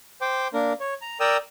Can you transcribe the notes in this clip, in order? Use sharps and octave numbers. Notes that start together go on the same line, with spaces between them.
C5 G5 D6
A#3 D4 A#4
C#5
A#5
A#4 D5 G5 A#5 D#6 E6